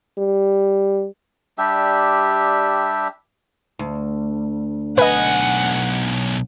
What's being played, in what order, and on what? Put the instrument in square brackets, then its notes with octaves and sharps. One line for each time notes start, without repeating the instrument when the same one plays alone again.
[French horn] G3
[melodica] G3 D4 G4 E5
[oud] D2
[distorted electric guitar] B1 G#5 [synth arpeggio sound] B4 D#5 [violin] F#5